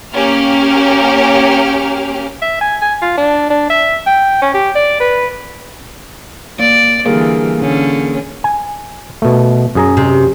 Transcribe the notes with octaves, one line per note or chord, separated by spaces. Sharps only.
A#3 C#4 G4 F6
E5
G#5
G#5
F4
D4
D4
E5
G5
C#4
G4
D5
B4
A#3 D5
D3 E3 G3 A#3 G#4 A#4
D3 C#4
G#5
B2 A3
F#2 G#4 A#5
C3